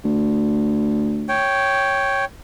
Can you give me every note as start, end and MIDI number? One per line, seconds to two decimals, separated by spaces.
0.04 1.47 38
1.29 2.25 73
1.29 2.25 79